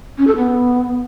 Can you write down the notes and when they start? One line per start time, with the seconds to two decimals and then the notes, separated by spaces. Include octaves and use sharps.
0.18 C#4
0.27 A4
0.36 B3